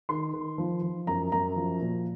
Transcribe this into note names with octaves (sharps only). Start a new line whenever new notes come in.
D#3 C6
D#3
F3
F3
F#2 A#5
F#2 A#5
F3
A#2